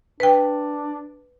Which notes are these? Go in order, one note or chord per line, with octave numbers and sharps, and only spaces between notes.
D4 B4 G5